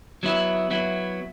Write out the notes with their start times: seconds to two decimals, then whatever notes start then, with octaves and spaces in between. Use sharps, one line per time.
0.23 F#3 B3 E4
0.71 F#3 B3 E4